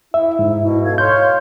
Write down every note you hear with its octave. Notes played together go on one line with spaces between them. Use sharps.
E4 E5
G#2 D#4
B2 E4
A4 F5 G#6
C#5 F5 C6 F6 G6